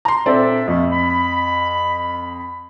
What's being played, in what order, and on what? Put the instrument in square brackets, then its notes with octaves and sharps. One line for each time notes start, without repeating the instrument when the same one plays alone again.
[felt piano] A#5 C6
[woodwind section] A#2 D4 E5 [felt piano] C4 A4 D5
[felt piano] F2 [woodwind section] A#2 A3 A#3
[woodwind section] B5